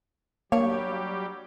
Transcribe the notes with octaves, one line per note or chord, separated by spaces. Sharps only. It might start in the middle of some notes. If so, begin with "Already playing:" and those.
F#3 G3 A#3 D4 G4 C#5